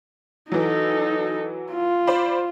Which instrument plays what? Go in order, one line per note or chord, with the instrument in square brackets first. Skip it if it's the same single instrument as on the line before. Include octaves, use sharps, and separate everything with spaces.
[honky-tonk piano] E3 F#3 [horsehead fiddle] D#4 A4
[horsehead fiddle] F4
[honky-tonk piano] C5 D5 B5